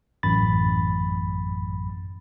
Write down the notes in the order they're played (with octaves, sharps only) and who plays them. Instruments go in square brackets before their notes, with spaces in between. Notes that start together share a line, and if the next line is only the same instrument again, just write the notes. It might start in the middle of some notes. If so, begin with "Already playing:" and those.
[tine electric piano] A1 F#2 B5 A6